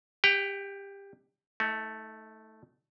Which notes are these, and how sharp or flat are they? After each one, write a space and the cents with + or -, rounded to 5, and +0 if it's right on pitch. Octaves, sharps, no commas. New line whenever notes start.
G4 +20 G5 -40
A3 -5 D#4 +40